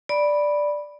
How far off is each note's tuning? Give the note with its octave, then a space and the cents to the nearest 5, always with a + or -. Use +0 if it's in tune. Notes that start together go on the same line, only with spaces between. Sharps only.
D5 +0 B5 -5